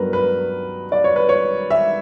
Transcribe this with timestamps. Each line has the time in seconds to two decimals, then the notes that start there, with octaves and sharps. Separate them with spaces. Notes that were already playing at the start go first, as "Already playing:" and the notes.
Already playing: G2 F#3 B3 D4 A#4 B4
0.13 B4
0.92 D5
1.04 C#5
1.16 B4
1.29 C#5
1.70 E5